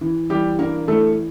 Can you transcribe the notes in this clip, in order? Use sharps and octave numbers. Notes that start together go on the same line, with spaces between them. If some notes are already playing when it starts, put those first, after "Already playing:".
E3
E3 G3 G4
G2 A#3 A#4
E3 A3 A4